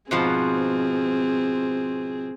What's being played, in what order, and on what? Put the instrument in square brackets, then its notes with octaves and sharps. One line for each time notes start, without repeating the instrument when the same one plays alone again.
[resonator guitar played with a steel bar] G#2 B2 F3 [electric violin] C4 G#4